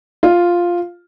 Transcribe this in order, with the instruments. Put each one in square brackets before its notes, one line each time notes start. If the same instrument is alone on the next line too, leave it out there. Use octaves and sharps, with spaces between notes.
[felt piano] F4